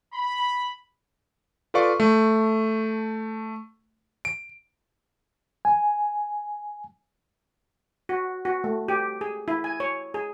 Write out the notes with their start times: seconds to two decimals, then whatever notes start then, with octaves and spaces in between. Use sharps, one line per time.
0.14 B5
1.74 F4 A4 B4 D5 F5 C#6
2.00 A3
4.25 D7
5.65 G#5
8.09 F#4
8.45 F#4
8.64 A3
8.89 G4
9.21 G#4
9.48 E4
9.64 G#5
9.80 C#5
10.14 G#4